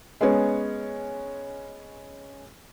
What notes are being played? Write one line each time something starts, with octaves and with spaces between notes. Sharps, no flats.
G#3 B3 C#4